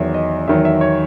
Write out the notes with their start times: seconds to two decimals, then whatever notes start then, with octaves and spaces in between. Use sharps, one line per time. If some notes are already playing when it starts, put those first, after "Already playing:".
Already playing: E2 D#3 F#3 E5
0.14 D#5
0.47 E2 D#3 F#3 E5
0.65 E5
0.81 C#5